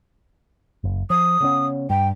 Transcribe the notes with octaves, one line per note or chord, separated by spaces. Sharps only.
F#1
F3 D#6
C#3 B3 C#4
G2 G5